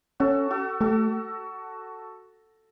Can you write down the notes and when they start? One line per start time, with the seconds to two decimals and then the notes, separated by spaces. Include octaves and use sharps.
0.20 C#4 F#4 A4
0.51 F#4 A4
0.81 A3 F#4 A4